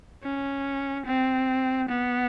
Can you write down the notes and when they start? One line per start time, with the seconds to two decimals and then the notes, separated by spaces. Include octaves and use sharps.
0.23 C#4
1.07 C4
1.89 B3